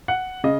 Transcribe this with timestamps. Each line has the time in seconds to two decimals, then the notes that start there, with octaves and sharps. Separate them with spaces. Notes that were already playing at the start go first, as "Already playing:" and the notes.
0.08 F#5
0.44 C#3 D#5